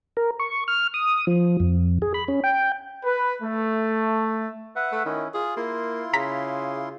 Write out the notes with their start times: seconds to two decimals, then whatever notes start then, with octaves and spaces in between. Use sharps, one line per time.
0.17 A#4
0.39 C#6
0.68 F6
0.94 D#6
1.27 F3
1.60 F2
2.02 G#4
2.14 B5
2.28 C#4
2.44 G5
3.05 B4
3.42 A3
4.76 B4 E5 F#5
4.92 A3
5.05 D#3 C#4 E4
5.34 F4 G#4
5.57 A#3 E4 F4 C6
6.13 C#3 A#5 B6